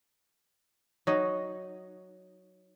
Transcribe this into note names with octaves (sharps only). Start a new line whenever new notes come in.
F#3 D#4